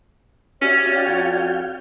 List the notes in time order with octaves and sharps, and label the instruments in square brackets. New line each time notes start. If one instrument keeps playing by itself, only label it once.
[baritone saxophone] C#4 [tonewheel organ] F#4 G4 E5 [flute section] C#5 D5
[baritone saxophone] C#4 [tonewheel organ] F#4 F5 G5
[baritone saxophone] F2